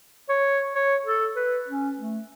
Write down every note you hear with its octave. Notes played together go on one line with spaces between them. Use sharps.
C#5
C#5
A4
B4
C#4
A3